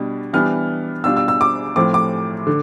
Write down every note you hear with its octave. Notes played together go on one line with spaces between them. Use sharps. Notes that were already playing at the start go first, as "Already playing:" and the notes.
Already playing: B2 G3 D4
E3 G3 B3 D4 F6
B2 G3 D4 F4 E6
E6
E6
D6
A2 F3 A3 C4 D6
D6
D3